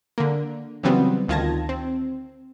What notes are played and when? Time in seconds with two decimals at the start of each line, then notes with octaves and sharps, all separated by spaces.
0.18 D3 A#3
0.83 C#3 E3 F#3 G3 B3 C4
1.28 D2 D#3 F4 A5 G#6 A#6
1.69 C4